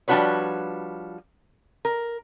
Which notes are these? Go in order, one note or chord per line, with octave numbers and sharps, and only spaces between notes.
F3 G3 D4 F#4 B4 C#5
A#4